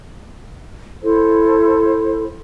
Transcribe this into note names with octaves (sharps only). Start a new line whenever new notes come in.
E4 A4 C5